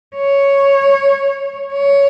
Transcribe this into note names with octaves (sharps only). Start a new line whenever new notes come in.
C#5
C#5